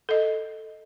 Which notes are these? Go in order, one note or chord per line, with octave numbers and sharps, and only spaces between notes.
A4 D#5